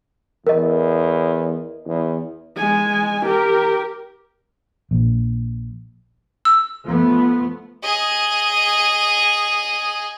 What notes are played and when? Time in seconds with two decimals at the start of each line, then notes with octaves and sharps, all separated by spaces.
0.47 E2 A#4 D#5
1.86 E2
2.57 G#3 G#5
3.26 G4 A#4
4.91 A#1
6.45 E6
6.86 F3 A3 B3
7.83 G#4 D#5